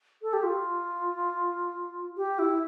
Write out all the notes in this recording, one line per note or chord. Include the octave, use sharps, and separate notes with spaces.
A4
G4
F4
G4
E4